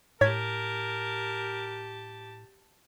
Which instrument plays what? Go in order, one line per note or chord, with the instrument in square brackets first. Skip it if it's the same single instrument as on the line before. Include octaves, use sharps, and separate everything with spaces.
[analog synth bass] A2 [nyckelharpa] G4 A5 [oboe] A#4 [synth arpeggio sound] C#5 G#6 B6